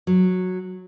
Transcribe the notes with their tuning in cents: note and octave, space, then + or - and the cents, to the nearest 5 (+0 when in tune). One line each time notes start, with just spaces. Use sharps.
F#3 -10